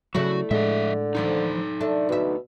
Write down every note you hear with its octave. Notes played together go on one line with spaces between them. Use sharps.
C#3 F#3 A3 D4 E4 F#4
A2 D3 F3 G#3 D#5 E5
D2 E3 F3 D#4 A4
A3 D4
D2 B2 E5